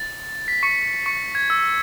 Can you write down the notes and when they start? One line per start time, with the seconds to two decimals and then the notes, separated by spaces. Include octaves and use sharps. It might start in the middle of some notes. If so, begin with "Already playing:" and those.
Already playing: A6
0.48 B6
0.63 C#6 C#7
1.06 C#6 C#7
1.35 G#6
1.50 E6